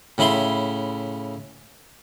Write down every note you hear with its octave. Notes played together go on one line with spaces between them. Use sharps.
A2 C#3 E4 B5 C6